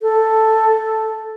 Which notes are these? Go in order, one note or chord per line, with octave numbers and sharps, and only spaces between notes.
A4